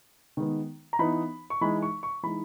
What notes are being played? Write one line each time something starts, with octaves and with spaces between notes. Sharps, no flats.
D#3 G#3 B3 D#4
A#5
E3 B3 D#4 B5
C#6
E3 G#3 D#4 B5
C#6
C#6
E3 G#3 D#4 B5